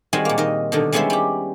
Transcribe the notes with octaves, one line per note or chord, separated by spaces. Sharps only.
D#3 G3 G#3 C4 F#4 G#5
A#2 A#3
D#3 D#5
B2 D3 D#3
G3 G#3 B3 C#4 E4 C5
G3 G4